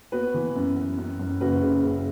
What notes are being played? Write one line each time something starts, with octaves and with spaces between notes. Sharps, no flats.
B3 F#4 B4
E3
F#2
F#2
F#2
F#2
F#1 F#4 B4
C#3
F#1